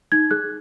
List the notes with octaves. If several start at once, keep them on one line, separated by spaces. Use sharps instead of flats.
D#4 G#6
G#4 F#6